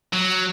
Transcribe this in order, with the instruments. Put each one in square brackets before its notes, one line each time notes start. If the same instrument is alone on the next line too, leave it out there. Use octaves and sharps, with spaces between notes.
[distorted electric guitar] F#3